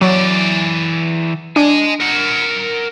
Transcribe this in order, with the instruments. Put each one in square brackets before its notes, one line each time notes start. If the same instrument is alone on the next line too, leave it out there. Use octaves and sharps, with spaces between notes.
[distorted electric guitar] E3 D5 [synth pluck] F#3
[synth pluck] D4 [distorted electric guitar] D#5 G#5
[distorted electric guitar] A#4 F#5